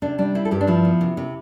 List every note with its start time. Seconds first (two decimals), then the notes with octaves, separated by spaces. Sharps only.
0.02 C3 D4
0.18 G3 D4
0.35 C4 E4
0.45 A4
0.51 G2 G4
0.61 D4
0.67 F3 E4
0.85 B3
1.01 C3
1.17 C3